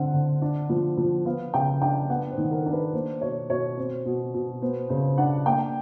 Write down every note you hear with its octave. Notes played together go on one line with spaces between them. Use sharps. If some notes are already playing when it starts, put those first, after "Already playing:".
Already playing: D3 C4 F#5
D3
D4
F3
F3
B3 F5
C#3 G5
D4 G5
B3 F#5
C5
D#3
A#4
D4
B4
A#3 C5
B2 C#5
B2 C#5
C4 C5
B2
B2
B3 C5
C#3 C5
D4 F#5
A#3 G5